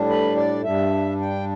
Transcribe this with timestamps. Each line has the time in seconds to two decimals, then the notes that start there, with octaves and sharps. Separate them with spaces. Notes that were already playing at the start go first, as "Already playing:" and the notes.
Already playing: A2 G3 D4
0.09 B4
0.37 D5
0.64 G2 G3 D4 E5
1.20 G5